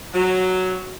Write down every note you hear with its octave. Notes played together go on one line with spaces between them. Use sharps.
F#3